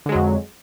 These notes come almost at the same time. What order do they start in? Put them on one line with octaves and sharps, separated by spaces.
D3 G#3 F#3 F2